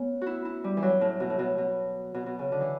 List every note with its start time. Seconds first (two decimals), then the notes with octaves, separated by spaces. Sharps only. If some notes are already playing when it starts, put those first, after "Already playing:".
Already playing: A3 B3 C#4
0.21 E4 F#4
0.45 E4
0.64 G3
0.77 E3
0.82 F#3
1.01 A2
1.20 B2
1.30 A2
1.39 B2
1.58 B2
2.14 B2
2.26 B2
2.39 C#3
2.52 D3
2.61 E3